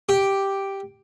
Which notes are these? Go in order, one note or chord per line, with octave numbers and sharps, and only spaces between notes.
G4